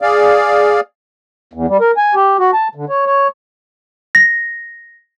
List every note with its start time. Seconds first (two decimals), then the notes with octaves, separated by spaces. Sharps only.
0.02 G#4 D5 F5
1.53 E2
1.68 G3
1.81 A#4
1.97 G#5
2.15 G4
2.39 F#4
2.53 A5
2.75 D3
2.89 C#5
3.06 C#5
4.15 A#6